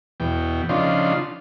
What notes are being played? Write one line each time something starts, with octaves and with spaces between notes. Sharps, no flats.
E2 B2 G5
C#3 F3 D4 D#4 F4 C6